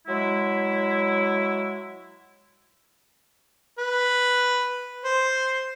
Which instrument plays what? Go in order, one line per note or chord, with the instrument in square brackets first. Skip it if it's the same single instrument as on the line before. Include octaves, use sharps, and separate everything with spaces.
[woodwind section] F#3 G#3 E4
[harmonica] B4
C5